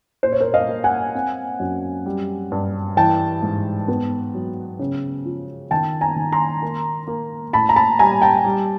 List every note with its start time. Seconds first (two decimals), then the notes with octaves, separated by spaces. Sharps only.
0.23 A#2 C5
0.32 C#5
0.40 A#4 C5
0.54 D#5 F5
0.69 A#3
0.84 F#5 G#5
1.15 C4
1.60 F#2
2.06 G3
2.52 G2
2.97 E3 G5 A5
3.43 G#2
3.88 B3
4.34 F#3
4.79 C#3
5.26 F3
5.71 D#3 G5 A5
6.01 G#5 A#5
6.16 D#3
6.32 A#5 C6
6.62 A#3
7.07 A#3
7.53 A2 A5 B5
7.69 A#5
7.76 A5 B5
7.99 G3 G#5 A#5
8.22 G5 A5
8.44 G3